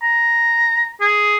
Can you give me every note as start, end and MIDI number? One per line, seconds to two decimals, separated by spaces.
0.02 0.91 82
1.01 1.37 68